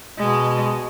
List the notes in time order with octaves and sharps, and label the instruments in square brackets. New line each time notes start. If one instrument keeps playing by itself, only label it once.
[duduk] B2 [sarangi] G#3